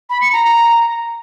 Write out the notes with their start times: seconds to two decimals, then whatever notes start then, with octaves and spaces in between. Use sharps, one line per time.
0.10 B5
0.21 C#7
0.33 A#5